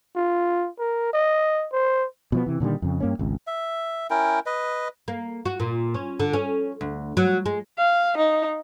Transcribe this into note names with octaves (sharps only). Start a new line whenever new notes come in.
F4
A#4
D#5
C5
B2 F3 B3
C3 E3
A#2 D3 D#3 G3
F2 C#3
G2 A#3 C#4
G#1 C#2
E5
C#4 E4 A#4 G5
B4 D#5
A#3
F#4
A#2
C#4
D3
C#4
D2
F#3
G#3
F5
D#4